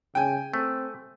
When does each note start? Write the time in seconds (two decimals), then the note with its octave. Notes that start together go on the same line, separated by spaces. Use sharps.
0.15 C#3 G5 G#5
0.54 A3 C4